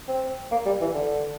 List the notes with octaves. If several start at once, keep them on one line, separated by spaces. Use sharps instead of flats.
C4
A#3
G3
E3
D3